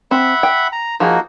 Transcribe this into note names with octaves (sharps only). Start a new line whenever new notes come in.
C4 E5 F#5 B5
G5
A#5
F3 A#3 D#4 F#4 G#4